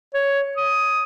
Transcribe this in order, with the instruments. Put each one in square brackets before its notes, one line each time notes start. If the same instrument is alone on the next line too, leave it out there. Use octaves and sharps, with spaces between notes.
[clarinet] C#5
D#6